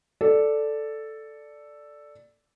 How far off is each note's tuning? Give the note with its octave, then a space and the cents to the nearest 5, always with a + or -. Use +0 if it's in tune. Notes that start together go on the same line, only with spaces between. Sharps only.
A4 +0 D5 +0